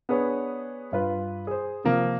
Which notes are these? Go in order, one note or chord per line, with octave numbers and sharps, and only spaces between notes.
B3 D4 G#4 B4 C#5
G2 F4 B4
G#4 C5
C3 F3 A#3